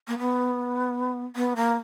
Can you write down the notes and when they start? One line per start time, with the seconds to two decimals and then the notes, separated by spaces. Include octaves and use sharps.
0.07 A#3
0.19 B3
1.36 B3
1.56 A#3